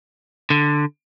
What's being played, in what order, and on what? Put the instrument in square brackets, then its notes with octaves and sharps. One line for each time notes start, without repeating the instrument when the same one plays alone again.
[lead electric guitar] D3